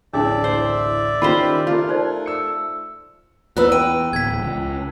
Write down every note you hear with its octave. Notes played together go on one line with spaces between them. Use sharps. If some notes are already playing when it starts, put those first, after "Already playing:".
D1 A1 D4 G#4 D5 E5 A5
C5
D#3 C#4 F4 G4 C5 F5 B5
A3 F4 A#4 F6
D#4 C5 D5
E6 C#7
E2 D#4 E4 B4 E6 F#6
G5 D#7
D1 E2 G#6 B6
C#2